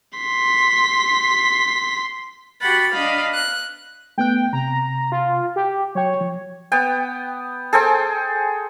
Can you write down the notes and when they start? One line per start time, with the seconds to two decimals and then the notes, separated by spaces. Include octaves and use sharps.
0.19 C6 B6
2.60 F#4 G4 F#5 B5 A6
2.92 D4 D#5 F5 B5
3.33 F#6
4.18 A3 B3 G5 F#6
4.53 C3 A#5
5.12 F4
5.56 G4
5.95 F#3 C#5 G5
6.21 F3
6.72 B3 G5
7.73 G#4 A4 C5 G5